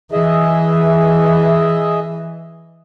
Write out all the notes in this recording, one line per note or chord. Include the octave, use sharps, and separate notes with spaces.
E3 G#4 D#5 E5